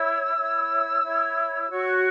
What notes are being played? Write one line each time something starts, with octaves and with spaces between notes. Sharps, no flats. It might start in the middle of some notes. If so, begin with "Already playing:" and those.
Already playing: E4 C#5 E6
E4 C#5
E4 C#5
F#4 C#5 C#6